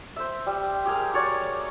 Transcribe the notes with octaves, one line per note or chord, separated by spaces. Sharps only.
C5 E5
G3
G4 G#4 A#4
F#4 A#4 C#5 D5